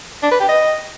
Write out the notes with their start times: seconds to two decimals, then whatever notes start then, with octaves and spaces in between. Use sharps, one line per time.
0.23 D4
0.31 B4
0.40 G4
0.49 D#5